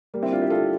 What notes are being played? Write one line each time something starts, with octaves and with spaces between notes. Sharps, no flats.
G3 A#3
C4 E4
D4 F4
E4 G4
F4 A4